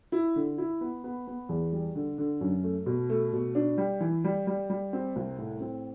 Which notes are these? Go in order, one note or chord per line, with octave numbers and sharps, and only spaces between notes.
E4
D3
E4
B3
B3
B3
E2
G3
D3
D3
F#2
A3
B2
A3
B2
D4
G3
E3
G3
G3
G3
C4
C2
A2
C4